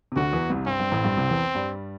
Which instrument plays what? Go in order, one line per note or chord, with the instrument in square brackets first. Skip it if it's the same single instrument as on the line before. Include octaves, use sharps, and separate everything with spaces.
[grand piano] C3
[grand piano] D2 D3 [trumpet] F#4
[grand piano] E2 E3
C2 C3
[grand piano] G2 [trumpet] C4
[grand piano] G2
A1 A2
G2
C2 C3
E2 E3
G2 G3